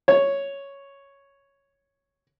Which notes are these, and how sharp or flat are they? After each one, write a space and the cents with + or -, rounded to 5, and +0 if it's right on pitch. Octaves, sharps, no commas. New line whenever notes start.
C#5 +0